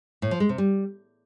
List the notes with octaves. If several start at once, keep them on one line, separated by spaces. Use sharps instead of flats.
A2
F3
G#3
C3
G3